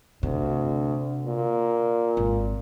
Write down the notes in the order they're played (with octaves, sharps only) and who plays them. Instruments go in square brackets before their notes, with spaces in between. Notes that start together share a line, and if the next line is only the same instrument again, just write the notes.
[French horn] D2 [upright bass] C3
[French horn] A#2
[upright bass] G#1